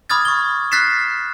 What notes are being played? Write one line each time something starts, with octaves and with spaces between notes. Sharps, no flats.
B5 D6 D#6 F6 G#6 A6
C#6 G7
F6 F#6 A6 B6 C7 E7